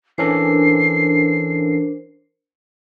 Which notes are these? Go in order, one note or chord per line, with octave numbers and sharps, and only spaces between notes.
E3 C#4 D4 A4 A#4 C5 C7